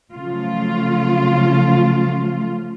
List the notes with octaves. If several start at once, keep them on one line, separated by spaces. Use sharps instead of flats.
C#3 F3 F#3 A3 F4